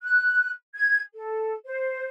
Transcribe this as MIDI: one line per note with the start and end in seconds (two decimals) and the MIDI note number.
0.02 0.51 90
0.74 1.00 92
1.13 1.54 69
1.64 2.08 72